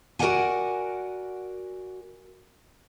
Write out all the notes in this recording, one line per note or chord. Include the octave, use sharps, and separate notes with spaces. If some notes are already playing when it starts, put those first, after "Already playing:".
F#4 A#4 C#5 D5 F#5 G#5